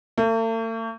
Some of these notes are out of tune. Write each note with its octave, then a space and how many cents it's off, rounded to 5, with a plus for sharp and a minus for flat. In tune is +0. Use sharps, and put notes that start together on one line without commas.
A3 +45